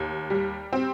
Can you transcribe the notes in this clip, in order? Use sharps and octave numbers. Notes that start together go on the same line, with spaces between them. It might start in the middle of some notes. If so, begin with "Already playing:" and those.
Already playing: D#2
G3
C4